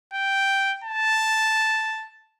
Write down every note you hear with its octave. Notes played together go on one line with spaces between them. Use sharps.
G5
A5